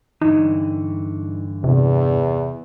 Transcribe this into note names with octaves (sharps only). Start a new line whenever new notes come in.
G2 D3 E3 D#4
E2 C3